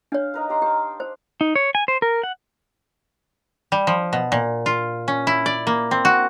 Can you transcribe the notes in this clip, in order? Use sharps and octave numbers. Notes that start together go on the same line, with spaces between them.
D4 C#5 F5
D#4 A#4 B4
G4 A#5 C6
G4 G5 A5
C5
D#4
C#5
G#5
C5
A#4
F#5
G3
F3
B2
A#2
F4
C#4
E4
D5
A#3
C4
F#4